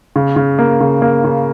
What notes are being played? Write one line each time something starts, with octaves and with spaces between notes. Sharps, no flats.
C#3
C#3
A#3
C#3
A#3
C#3